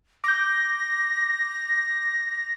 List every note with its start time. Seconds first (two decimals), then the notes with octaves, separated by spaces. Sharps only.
0.24 D6 G6 A#6